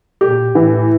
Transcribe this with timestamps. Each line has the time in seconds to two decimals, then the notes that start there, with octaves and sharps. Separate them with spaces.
0.21 A#2 G4
0.55 A2 E3